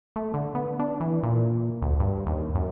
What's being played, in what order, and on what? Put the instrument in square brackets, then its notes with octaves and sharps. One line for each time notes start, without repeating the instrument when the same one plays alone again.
[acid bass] A3
D3
B3
D4
E3
A#2
D2
G2
D#2
F#2